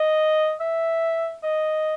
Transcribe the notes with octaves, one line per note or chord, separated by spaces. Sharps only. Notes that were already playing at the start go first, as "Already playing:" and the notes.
Already playing: D#5
E5
D#5